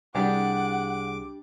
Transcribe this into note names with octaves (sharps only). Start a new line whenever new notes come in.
C2 G3 D4 G4 G#4 F#5 D6